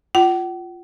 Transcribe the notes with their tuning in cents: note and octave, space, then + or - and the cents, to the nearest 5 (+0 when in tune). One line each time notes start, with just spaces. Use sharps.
F4 +0 F#5 +45